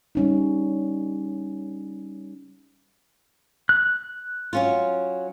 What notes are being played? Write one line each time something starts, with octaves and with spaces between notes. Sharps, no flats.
G3 C#4 D#4
F#6
F#3 C#4 F4